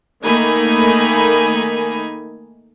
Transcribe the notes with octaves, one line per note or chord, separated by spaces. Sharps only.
D#3 A3 A#3 D#4 G#5 B5